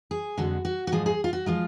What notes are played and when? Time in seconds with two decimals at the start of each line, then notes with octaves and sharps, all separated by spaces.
0.11 G#4
0.37 F2 D3 G#3 F#4
0.65 F#4
0.87 F#4
0.92 G#2 F3 G#3 G#4
1.06 G#4
1.24 F4
1.33 F#4
1.46 F3 G#3 F4